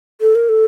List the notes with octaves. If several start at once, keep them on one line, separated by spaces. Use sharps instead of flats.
A4
A#4
A4